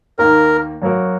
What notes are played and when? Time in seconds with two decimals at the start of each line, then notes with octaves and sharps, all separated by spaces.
0.18 D#2 D#3 A#3 A#4
0.82 F#2 F#3 A#3 F#4 A#4